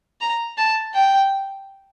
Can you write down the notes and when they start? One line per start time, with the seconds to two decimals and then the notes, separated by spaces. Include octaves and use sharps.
0.21 A#5
0.57 A5
0.94 G5